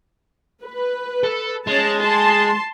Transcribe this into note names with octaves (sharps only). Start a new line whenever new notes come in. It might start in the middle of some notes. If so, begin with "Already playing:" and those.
B4
A4
G#3 C#4 A5
A5 C6